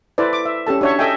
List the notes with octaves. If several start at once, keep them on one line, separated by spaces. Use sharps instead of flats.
E4 A4 B4 C5 D5
D6
E5
C#4 G4 A4 A5
D4 F#4 C#5 E5 C#6
A4 D#5 E5 G5 G#5